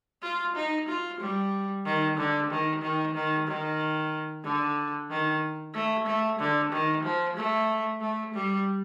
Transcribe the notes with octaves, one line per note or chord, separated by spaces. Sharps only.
F4
D#4
F4
G3
D#3
D3
D#3
D#3
D#3
D#3
D3
D#3
A3
A3
D3
D#3
F3
A3
A3
G3